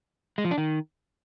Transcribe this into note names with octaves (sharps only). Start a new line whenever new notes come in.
G#3
F3
D4
D#3